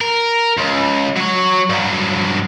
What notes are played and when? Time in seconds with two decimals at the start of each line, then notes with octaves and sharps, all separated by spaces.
0.01 A#4
0.58 C#2
1.17 F#3 C#5
1.70 G2 F#3